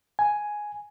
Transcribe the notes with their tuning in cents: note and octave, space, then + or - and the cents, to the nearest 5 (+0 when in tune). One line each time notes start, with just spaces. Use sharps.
G#5 +5